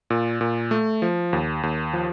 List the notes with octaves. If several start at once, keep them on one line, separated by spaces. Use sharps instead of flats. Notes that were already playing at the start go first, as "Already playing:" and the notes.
A#2
A#2
A3
F3
D#2
D#2
F3